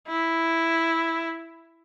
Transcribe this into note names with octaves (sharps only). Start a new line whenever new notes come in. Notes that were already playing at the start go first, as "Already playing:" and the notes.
E4